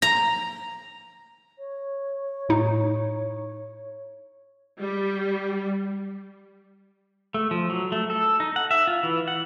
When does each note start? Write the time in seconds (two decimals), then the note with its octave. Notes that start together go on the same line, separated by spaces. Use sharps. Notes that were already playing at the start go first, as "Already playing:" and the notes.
0.02 A#5
1.58 C#5
2.49 A2 D#4
4.80 G3
7.34 A3
7.51 F3
7.70 F#3
7.92 A3
8.10 A4
8.40 D#4
8.56 F#5
8.71 E5
8.87 F4
9.03 E3
9.28 F#5